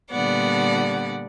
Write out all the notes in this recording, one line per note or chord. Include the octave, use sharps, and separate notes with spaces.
A#2 D3 G3 B3 D5 F#5